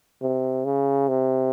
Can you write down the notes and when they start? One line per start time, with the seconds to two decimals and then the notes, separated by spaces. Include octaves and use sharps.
0.22 C3
0.65 C#3
1.08 C3